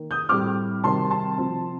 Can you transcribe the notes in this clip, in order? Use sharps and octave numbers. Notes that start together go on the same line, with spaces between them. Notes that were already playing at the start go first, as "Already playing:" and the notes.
Already playing: D#3 A#3
D#6 G6
A2 G3 C4 D6 F6
C3 D#3 G3 C4 A5 C6
A5 C6
C3 F3 C4